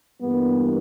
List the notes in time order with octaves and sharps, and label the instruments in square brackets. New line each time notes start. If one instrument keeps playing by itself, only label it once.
[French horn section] G2 E3 G3 A#3 B3